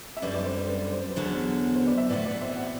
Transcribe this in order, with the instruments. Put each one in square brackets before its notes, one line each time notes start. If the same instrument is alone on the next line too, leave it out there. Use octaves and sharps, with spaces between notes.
[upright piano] E5
[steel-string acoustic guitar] F#2 D3 G3 [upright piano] B4 D5
[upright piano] B4 D5
C5
B4
B4
C5
B4
[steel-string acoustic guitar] E2 D3 F#3 B3 [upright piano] C5
[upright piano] C5
B4 D5
C5 E5
[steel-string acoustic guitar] A2 E3 B3 F#4 [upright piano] B4 D5
[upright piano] B4 D5
C5 E5
D5 F#5